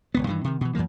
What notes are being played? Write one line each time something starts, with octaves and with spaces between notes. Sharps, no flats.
E1 C#2 B3
G2 D#3 E3
C3 D#3
B2 E3
F#2 E3 F3 A#3